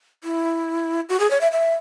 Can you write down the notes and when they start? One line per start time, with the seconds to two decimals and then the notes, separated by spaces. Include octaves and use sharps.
0.24 E4
1.09 F#4
1.20 G#4
1.31 C#5
1.41 E5
1.52 E5